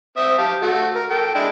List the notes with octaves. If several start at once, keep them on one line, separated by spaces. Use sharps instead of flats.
C4 E5 D#6
G4 F5 A5
A3 F#4
A#4
A4 G5
G#3 D4 E4